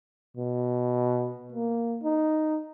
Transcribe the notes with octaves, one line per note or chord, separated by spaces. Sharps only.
B2
A#3
D#4